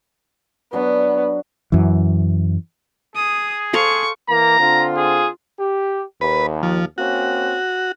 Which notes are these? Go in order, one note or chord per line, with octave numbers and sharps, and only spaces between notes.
F#3 B3 D4
F#2 E3
G#4 D#6
A4 C5 F5 C#6
E3 A#3 A#5
D3 C4 F4
G#4
G4
D#2 B4
F3
A#3 C4 C#4 F#4